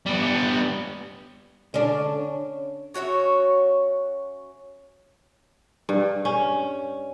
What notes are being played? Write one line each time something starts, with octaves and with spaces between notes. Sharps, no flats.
G3 B3
D3 C#4 D4
C#5
C#4 F#4 C#5 E5
G2
C#4